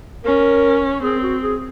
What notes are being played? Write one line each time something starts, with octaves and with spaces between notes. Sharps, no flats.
C#4 A#4
C4 G#4
F#4
G#4